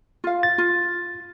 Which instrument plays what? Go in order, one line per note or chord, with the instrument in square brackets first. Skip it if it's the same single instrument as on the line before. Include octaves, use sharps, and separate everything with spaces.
[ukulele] F4 F5
[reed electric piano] A6
[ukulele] F4